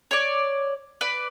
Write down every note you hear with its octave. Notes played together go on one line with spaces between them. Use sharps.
C#5 D5
B4 D5